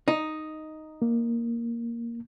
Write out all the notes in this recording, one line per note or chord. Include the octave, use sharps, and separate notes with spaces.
D#4
A#3